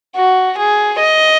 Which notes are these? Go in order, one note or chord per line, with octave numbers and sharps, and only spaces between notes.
F#4
G#4
D#5